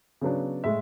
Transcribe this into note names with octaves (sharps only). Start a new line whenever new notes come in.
C#3 F#3 B3 D4
A2 G#3 E5